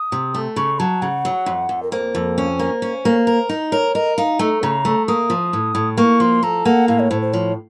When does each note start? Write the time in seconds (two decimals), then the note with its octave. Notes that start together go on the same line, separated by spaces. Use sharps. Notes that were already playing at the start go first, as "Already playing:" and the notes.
Already playing: D#6
0.12 C3
0.34 A3
0.56 C#3 C#6
0.79 F#3 A5
1.02 C#3 F#5
1.25 F#3
1.46 F2
1.69 F2
1.83 A#4
1.92 A#3 C5
2.15 F2
2.38 C#4
2.59 A#3
2.82 C#4
3.05 A#3
3.27 A#4
3.49 D#4
3.72 A#4 C#5
3.95 A#4 D#5
4.17 D#4 F5
4.39 A3 A#5
4.63 C#3 A#5
4.85 A3
5.08 A#3 D#6
5.30 F3
5.53 A2
5.75 A2
5.97 A#3 C#6
6.20 F3 C6
6.43 A4 A#5
6.65 A#3 F#5
6.88 A2 F5
6.99 C#5
7.10 A2 C5
7.22 C5
7.33 F3 C#5